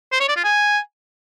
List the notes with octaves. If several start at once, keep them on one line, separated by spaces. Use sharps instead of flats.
C5
C#5
D5
F4
G#5